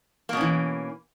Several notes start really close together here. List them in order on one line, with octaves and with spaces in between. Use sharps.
A#3 B2 C#4 E3